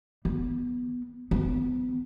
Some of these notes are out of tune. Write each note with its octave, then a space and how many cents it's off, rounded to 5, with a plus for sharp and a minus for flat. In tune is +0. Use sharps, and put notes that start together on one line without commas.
B3 -5
B3 +30